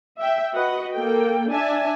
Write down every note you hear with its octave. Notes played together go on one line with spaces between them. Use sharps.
E5 G5
F#4 B4 D#5 F#5
A#3 A4 G5
D4 E5 G#5 A5